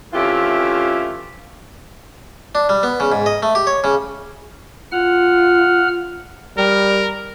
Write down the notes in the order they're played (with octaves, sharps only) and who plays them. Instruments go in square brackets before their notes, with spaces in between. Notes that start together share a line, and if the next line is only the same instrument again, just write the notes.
[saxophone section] E3 A3 C4 C#4 F4 G4
[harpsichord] D4
G3
B3
C#3
G#2
D#5
A3
G4
C#5
C#3
[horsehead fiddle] F4 [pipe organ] F#5 F6
[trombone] G3 [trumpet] A#4